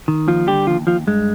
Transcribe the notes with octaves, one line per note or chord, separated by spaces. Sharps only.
D#3
D#2 F3 F4
D3 G3 G4
D#2 F3 F4
D#2 F3 F4
G2 G#3